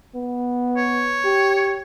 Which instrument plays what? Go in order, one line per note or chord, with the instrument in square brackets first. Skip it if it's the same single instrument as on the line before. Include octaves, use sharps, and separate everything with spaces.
[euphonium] B3
[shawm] C#5
[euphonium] G4